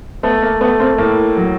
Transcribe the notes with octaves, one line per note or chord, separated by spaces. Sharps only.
A3 B3
A#3
A3 B3
A#3 C4
A2 A#3
F#3